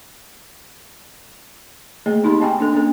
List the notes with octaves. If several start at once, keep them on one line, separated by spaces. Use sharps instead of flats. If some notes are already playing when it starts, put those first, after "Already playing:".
A3 A#3 G#4 D#5
B3 D#4 G4 B5
C4 D#5 G5 G#5
A#3 D4 A4
A#3 C#4 A4